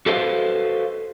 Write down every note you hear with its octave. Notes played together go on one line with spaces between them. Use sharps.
F#4 A4 B4 C5 D#5 F5